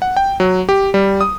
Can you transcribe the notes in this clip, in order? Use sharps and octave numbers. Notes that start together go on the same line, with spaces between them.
F#5
G5
F#3
G4
G3
D#6